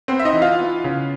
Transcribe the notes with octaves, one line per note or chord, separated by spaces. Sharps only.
B3 C4 C5
E5
D#4 D#5
E3
F4 F5
B3
C#3